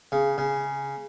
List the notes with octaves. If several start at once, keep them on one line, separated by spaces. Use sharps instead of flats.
C#3
C#3